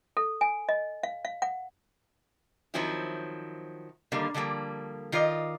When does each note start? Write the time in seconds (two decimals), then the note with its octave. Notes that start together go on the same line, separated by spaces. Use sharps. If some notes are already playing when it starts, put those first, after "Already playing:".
0.17 A4
0.41 G#5
0.69 D#5
1.03 F5
1.25 F5
1.42 F#5
2.74 D#3 F3 F#3 C4 E4
4.12 D3 D#3 G3 A#3
4.34 D3 F3 G3 A#3
5.12 D#3 F4 D5 D#5